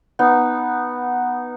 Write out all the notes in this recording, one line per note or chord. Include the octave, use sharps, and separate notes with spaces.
B3 D#4